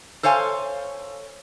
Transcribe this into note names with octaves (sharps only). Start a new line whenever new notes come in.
A4 C5 C#5 F5 G#5